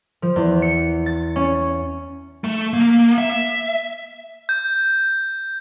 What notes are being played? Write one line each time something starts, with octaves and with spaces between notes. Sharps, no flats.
F3
E2
C#7
A6
C#4
A3
A#3
E5
E5
G6